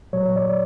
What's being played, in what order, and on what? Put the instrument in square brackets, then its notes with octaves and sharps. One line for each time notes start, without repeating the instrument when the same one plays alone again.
[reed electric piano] A#2 F#3 C#5
D5